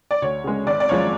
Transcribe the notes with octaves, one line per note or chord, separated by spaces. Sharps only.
D5
D2 C#5
C#3 G#3
G#1 D5
D5
F#2 F3 G#3 C#5